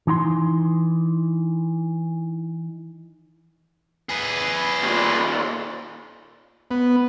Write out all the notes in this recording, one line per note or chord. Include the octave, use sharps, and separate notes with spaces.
E3 D#4 A#5 C6
G#4 B4
D#2 A#2
B3